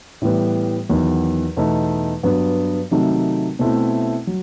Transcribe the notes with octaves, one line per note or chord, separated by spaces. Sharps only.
A2 E3 G3 B3
E2 D#3 F#3
E2 B2 A3 D#4
G2 F#3 B3
C3 D#3 F#3 A3 D#4
B2 A3 C4 E4
F#3